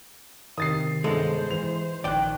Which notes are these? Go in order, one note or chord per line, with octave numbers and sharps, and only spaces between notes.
C3 D#3 D#6 A6 C7
G1 G#3 A4 C5
E3 F7
A#1 D#3 D5 G5 F#6